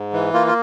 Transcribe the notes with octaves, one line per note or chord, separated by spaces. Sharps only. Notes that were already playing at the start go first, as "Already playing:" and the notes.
Already playing: G#2
E3
A#3 F4
F4